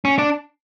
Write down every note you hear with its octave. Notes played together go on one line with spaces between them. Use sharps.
C#4
D4